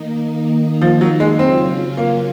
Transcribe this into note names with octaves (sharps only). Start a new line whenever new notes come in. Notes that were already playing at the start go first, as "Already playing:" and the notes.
Already playing: D#3 A#3 D#4
F3
F#3
G#3
C#3 F#3 C4 C#4 F4
A#3